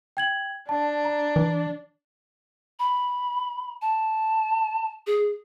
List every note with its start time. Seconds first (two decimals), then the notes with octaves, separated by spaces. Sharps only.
0.17 G5 G#6 F#7
0.69 D4 A5
1.05 A#5
1.36 E3
2.79 B5
3.82 A5
5.07 G#4